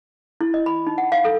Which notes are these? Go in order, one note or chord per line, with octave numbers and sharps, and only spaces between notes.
E4
D#5
B5
D#4
F#5
F5
A4